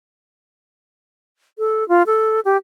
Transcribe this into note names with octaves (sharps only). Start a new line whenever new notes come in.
A4
F4
A4
G4